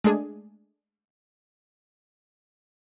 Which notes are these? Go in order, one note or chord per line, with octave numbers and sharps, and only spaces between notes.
G#3 A3 D4 G#4